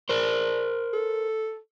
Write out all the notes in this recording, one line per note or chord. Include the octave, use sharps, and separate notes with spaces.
A#4 C5 D5
A4